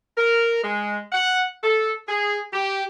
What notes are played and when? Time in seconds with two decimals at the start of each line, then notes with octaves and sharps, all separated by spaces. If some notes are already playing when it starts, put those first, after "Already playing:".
0.17 A#4
0.64 G#3
1.11 F#5
1.64 A4
2.08 G#4
2.53 G4